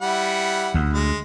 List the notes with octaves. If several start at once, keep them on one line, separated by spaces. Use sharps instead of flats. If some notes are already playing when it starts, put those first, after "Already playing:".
G3 E4 F#5
D2
G#3